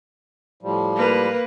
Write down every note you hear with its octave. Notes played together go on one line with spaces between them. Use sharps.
A2 F3 G3
A#3 B4